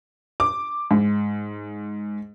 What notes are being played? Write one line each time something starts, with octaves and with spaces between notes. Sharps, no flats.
D6
G#2